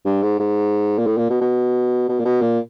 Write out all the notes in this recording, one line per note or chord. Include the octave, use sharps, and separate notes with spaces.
G2
G#2
G#2
A#2
A2
A#2
B2
B2
B2
A#2
B2
A#2